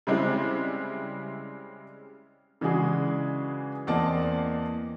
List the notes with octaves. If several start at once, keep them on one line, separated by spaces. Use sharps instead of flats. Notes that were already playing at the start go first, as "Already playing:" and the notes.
C#3 G3 G#3 C4 E4
C#3 E3 G#3 D4 F#4 G#4
E2 A#3 C4 D5 D#5 A5